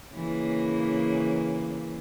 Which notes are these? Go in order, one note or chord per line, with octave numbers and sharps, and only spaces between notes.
C#3 E3 A#3